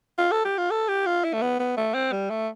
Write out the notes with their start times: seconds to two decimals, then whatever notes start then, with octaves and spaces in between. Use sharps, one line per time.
0.18 F4
0.31 A4
0.45 G4
0.58 F4
0.71 A4
0.89 G4
1.06 F4
1.24 E4
1.33 A3
1.42 B3
1.59 B3
1.77 A3
1.94 C4
2.12 G3
2.30 A3